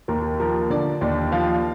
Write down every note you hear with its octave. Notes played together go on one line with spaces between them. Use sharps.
D#2 A#4
F3 A#4
D3 D5
D#2 D5
F3 F5